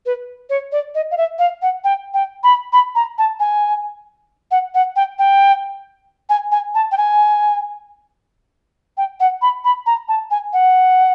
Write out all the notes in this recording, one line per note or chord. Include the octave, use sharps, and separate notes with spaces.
B4
C#5
D5
D#5
F5
E5
F5
F#5
G5
G5
B5
B5
A#5
A5
G#5
F#5
F#5
G5
G5
G#5
G#5
A5
G5
G#5
G5
F#5
B5
B5
A#5
A5
G#5
F#5